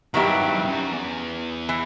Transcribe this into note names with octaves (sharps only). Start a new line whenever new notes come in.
G2 D#3 F#3 B3 E4 G4
G2
F2
F#2
E2
E3